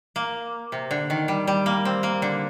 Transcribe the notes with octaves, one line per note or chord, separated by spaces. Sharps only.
A#3
C3
D3
D#3
G3
G3
A#3
C4
A#3
D3